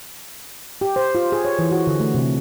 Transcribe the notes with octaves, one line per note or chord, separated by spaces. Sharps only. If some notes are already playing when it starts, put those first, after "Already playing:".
G4
C5
F4
G#4
C#5
E3
F#4
D3
A3
C3